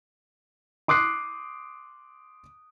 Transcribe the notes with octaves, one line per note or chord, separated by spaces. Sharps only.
C6 D6 D#6 F#6 C7